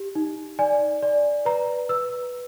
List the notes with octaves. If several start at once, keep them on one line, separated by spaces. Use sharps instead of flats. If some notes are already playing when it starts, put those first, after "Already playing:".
Already playing: G4
D#4
D5 G#5
D5
B4 A#5
B4 E6